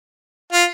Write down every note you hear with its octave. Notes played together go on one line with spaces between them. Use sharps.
F4